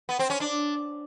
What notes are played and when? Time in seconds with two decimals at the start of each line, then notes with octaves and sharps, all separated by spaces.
0.09 B3
0.19 C4
0.30 C#4
0.40 D4